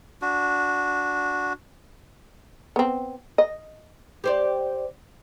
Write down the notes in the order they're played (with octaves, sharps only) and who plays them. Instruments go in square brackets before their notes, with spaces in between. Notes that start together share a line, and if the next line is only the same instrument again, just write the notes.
[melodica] D4 F#4
[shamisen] B3 C4
D#5
[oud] G4 C5 D5